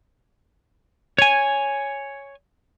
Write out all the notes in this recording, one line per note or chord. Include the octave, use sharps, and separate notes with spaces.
C#5 G#5